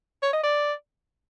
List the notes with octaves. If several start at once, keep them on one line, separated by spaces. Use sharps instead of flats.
C#5
D#5
D5